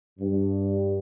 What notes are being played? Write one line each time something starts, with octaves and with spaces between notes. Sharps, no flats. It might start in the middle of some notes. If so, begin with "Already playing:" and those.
G2